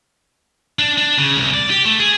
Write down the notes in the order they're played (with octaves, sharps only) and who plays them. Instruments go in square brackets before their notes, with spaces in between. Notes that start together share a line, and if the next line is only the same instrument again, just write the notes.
[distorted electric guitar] D4
D4
C#3
C2
D5
G4
A3
G#4